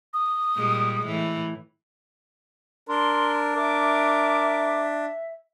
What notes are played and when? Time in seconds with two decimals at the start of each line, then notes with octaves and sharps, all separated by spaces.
0.14 D#6
0.56 A#2 G3 G#3
1.06 A2 E3
2.89 D4 A#4 C6
3.56 A#4 E5 D6